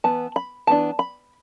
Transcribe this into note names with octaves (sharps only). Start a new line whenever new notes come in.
E3 B3 A5
B5
E3 B3 D4 A5
B5